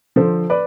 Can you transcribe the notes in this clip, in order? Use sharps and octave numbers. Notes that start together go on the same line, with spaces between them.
D3 F3 A4 C5
B4 D5